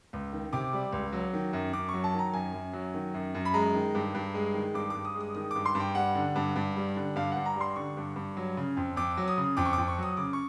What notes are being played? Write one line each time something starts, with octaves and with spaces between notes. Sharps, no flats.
C#2
D#3
C3 D6
G3
C#2
F#3
D#3
F#2
F#2 D6
C#6
F#3
A5
D#3 A#5
F#2 G#5
F#2
F#3
D#3
F#2
F#2
B5
G#3 A#5
D#3
G2
G2
G#3
D#3
G2 D6
D6
G2
D#6
G#3 D#6
D#3 D#6
G2 D6
C6
G2
G5
G3 F#5
D3
G2
G2
G3
D3
G2 F5
G2 F#5
A#5
G3 C6
D3 C#6
G2
G2
F#3
C#3
F2
F2 D6
F#3
D#6
C#3
F2 D6
C#6
D6
F2
C#6
F#3 D#6
C#3 D6
C#6